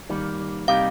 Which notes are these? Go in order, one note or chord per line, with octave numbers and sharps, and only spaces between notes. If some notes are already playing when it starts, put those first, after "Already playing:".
D#3 G3 A#3
C3 G3 A#3 D#4 G4 F5